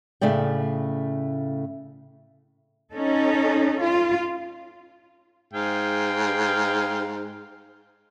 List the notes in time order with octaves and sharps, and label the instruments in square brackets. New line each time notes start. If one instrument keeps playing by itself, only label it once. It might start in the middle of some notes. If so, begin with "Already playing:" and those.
[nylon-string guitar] A2 C#3 A3 D5 G5
[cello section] C#4 D#4 A4
F4
[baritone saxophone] G#2 [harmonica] G#4 F5 G5